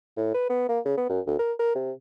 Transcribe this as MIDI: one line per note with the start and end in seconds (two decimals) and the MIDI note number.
0.17 0.30 45
0.34 0.46 71
0.49 0.67 59
0.69 0.80 58
0.85 0.95 49
0.97 1.08 59
1.10 1.20 42
1.27 1.38 38
1.39 1.53 70
1.59 1.74 70
1.75 1.92 48